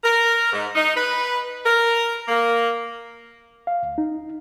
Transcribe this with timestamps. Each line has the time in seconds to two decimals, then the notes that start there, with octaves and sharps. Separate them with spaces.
0.04 A#4
0.53 G#2
0.75 D#4
0.97 B4
1.65 A#4
2.28 A#3
3.67 F5
3.83 D2
3.98 D#4